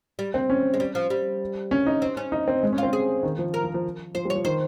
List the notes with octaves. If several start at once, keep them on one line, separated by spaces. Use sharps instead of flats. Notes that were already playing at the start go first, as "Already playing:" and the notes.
G3
C4
C#4
G#3
G3
F3
G3
C#4
D#4
C4
C#4
D#4
C4
G#3
C#4
C4 F4
G#4
D#3
F3
A#4
F3
F3
F3 C5
G3
C#5
F3
D#3 C5